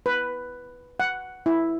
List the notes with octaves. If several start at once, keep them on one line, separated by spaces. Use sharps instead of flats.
B4
F#5
E4